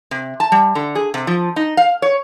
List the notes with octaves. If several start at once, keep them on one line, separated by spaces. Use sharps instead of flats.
C3
A5
G3
D3
G#4
C3
F3
D#4
F5
C#5